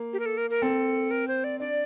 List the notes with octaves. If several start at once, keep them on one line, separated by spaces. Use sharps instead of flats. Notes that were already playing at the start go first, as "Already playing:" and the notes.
Already playing: A#3
G4
A#4
A4
A#4
A#4
C4 A4
A#4
C5
D5
D4 D5